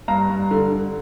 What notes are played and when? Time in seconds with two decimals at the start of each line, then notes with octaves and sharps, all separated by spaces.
0.08 G2 F5 A#5
0.29 G2
0.51 D3
0.72 D3